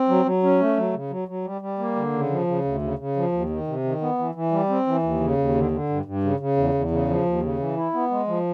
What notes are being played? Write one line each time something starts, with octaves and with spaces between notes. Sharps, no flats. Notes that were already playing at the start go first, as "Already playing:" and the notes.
Already playing: C4
F#3
F#3
C#4
A3
F#3
C#3
F#3
F#3
G3
G3
A#3
D3
C#3
F3
C#3
D2
C#3
C#3
F3
D#2
D#3
C3
D#3
B3
E3
E3
G3
C4
E3
D#2
C#3
D#2
D3
D3
G2
G2
C#3
C#3
E2
E2
C#3
F3
D#2
C#3
E3
E4
B3
G#3
F3